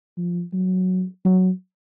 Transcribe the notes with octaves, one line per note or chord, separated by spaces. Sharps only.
F3
F#3
F#3